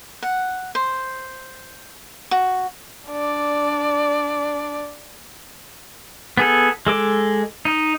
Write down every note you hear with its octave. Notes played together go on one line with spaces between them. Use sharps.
F#5
C5
F#4
D4 D5
B3 G#4 A4
G#3 A4 D6
D#4